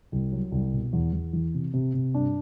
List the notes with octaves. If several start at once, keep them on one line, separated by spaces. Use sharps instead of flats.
C2
F#3
C2
B2
E2
E2
E3
C3
C3
C3
G2 D4